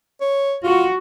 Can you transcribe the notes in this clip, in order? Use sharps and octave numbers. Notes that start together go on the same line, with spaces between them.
C#5
F4 F#4